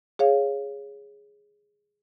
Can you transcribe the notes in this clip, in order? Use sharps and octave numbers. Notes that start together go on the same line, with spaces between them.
G#4 C#5 F5